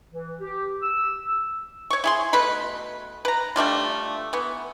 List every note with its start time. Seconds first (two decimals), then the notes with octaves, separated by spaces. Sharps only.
0.10 E3
0.41 G4
0.82 E6
1.90 C#5 C#6
2.04 E4 G#4 C6
2.33 B2 A3 B4 B5
3.25 B4 A#5
3.56 G3 A3 D4 F4
4.33 E3 B3